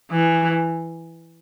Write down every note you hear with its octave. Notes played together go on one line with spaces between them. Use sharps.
E3